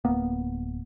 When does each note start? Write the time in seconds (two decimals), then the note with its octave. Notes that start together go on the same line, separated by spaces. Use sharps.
0.05 D1 A#3 B3